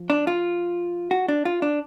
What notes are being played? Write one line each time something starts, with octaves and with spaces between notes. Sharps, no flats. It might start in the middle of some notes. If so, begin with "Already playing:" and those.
Already playing: F3
D4
F4
F#4
D4
F4
D4